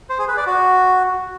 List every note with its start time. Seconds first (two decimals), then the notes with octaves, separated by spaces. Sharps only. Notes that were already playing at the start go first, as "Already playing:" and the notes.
0.09 C5
0.19 G#4
0.28 B4
0.37 D5
0.47 F#4